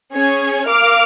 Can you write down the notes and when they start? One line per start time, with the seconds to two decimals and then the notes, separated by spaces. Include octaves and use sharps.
0.12 C#4 G#4 C#5 G#6
0.67 A#4 F5 D6 F6